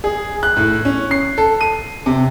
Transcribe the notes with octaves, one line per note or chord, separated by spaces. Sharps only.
G#4
F#6
A2
C#4
C7
A4
D#7
C3